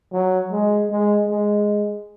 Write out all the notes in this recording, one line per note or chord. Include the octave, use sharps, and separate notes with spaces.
F#3
G#3
G#3
G#3